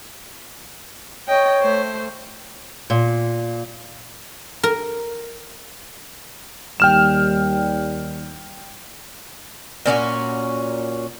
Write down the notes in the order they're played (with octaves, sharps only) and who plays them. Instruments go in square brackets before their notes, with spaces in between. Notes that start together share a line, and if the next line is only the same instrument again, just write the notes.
[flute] C#5 [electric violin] D#5 G5
[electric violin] A3 C5
[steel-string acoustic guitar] A#2
[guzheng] A#4
[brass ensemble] D#2 G3 [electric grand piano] G5 F6 E7
[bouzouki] A#2 C#4 F4 F#4